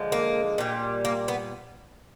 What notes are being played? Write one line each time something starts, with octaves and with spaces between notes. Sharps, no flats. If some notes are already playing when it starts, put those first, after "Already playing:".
Already playing: D3 F3 G#3
A#3
A#2 G3
A#3
B3